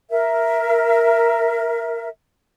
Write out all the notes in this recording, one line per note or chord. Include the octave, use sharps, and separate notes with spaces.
A#4 E5